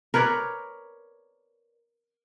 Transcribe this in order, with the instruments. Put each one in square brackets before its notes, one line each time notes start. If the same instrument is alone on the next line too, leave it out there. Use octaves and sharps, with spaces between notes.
[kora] A#4 B4 C#5 D5